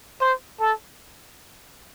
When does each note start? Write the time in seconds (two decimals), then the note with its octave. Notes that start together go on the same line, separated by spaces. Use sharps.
0.21 C5
0.60 A4